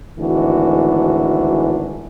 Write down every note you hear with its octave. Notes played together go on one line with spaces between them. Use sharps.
G#1 D2 E3 G#3 D4 F#4